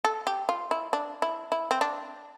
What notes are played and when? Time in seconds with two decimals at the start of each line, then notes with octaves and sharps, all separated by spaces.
0.05 A4
0.27 G4
0.49 F4
0.71 E4
0.93 D4
1.22 E4
1.52 E4
1.71 C4
1.81 D4